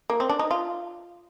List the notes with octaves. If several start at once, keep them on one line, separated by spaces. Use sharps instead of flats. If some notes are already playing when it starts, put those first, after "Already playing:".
A#3
C4
D4
D#4
F4